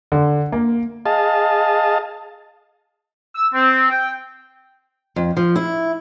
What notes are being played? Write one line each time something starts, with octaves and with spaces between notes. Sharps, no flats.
D3
A#3
G#4 D#5 F5 A5
E6
C4
G5
F2
F3
E4